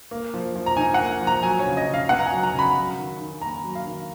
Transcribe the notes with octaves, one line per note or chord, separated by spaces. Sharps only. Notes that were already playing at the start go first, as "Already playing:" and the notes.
A#3
F3
F3
A#5
D#4 G#5
F#5
A#3
F3
A#5
F#3 G#5
C#5
C#3
D#5
C#3
F5
B3 F#5
A#5
G#5
F#3
A#5
C#3
B5
F#3
D#3
D#3
A#3 A#5
F#3
F5
D#3